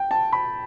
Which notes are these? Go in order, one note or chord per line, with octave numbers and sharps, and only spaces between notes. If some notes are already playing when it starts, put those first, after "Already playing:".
Already playing: G5
A5
B5